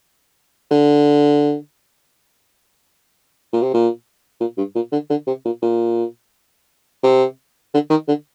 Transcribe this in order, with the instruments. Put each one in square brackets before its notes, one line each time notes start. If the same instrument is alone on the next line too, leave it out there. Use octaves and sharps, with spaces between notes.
[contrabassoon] D3
A#2
C3
A#2
A#2
G2
A#2
D3
D3
C3
A#2
A#2
C3
D3
D#3
D3